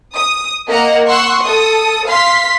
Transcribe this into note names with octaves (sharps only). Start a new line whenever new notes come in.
D#6
A#3 A#4 D#5 F#5 A#5
F#5 C6 C#6 E6 F#6
A4 D#6
F5 C6 B6